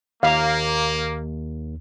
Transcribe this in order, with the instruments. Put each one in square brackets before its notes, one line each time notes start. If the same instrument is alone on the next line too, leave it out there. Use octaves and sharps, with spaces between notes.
[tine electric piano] D#2 [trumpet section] A#3 [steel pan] F5